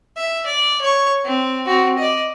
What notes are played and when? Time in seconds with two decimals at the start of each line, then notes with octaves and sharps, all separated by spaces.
0.17 E5
0.46 D5
0.82 C#5 C#6
1.25 C4
1.66 C4 F#4
1.98 D5 D#5